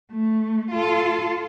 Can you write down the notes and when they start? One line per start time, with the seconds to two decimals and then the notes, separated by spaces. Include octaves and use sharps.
0.12 A3
0.71 F4 A4